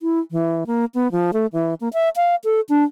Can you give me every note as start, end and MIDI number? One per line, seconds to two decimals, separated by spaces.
0.01 0.20 64
0.31 0.64 52
0.67 0.85 58
0.95 1.11 59
1.12 1.31 53
1.33 1.47 57
1.53 1.74 52
1.81 1.89 58
1.93 2.09 76
2.16 2.35 77
2.44 2.61 69
2.69 2.84 62